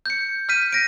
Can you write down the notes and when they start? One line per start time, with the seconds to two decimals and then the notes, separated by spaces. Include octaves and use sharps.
0.06 G6 C#7
0.49 F6 G6 B6 D#7
0.73 A#6 D7